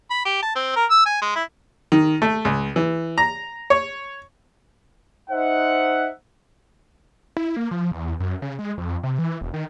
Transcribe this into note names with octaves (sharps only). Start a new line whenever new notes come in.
B5
G4
A5
C4
A#4
E6
G#5
G#3
E4
D#3
A3
C#2
E3
A#5
C#5
D#4 C5 E5 F#5
E4
A#3
F3
E2
F#2
C#3
G#3
F2
C3
E3
E1
D#3